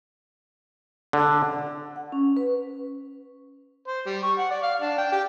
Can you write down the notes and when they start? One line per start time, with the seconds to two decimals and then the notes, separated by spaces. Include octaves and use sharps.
1.13 D3
1.96 F#5
2.12 C#4
2.37 B4
3.88 C5
4.06 G3
4.23 C#6
4.38 F#5
4.51 D5
4.63 F5
4.81 D4
4.98 G5
5.12 G4